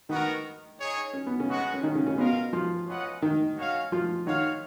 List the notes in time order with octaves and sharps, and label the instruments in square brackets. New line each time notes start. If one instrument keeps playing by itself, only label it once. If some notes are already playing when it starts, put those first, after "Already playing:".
[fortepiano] D#3 D#4 [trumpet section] B3 F#4 A#4
[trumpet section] D#4 G#4 C#5
[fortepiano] C#4
B3
C#3 C#4
[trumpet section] G#3 B3 F#4
[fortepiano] C#4
D#3 D#4
C#3 C#4
C#3 C#4
[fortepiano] B2 B3 [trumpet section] F4 A#4 F5
[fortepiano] F3 F4
[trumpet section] C#4 F4 B4 D#5 F#5
[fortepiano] D#3 D#4
[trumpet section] C#4 F#4 C#5 F5
[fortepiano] F3 F4
[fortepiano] D#3 D#4 [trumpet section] F#4 C#5 F5